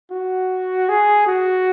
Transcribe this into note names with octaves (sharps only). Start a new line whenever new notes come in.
F#4
G#4
F#4